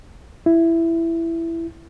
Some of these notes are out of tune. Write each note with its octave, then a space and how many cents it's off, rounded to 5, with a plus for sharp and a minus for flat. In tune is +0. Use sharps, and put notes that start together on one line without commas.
E4 +10